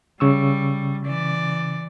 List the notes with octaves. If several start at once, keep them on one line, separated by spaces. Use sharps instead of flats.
C#3 G3 C#6 E6
E3 D5